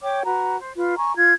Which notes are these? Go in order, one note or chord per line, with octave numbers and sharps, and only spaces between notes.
C#5 G5 D6
F#4 B4 A#5
C5
F4 B4
G#5 A#5 C#6
F4 G#6